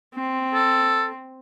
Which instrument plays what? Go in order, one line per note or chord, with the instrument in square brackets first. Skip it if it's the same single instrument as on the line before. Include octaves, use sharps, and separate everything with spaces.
[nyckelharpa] C4
[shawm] A4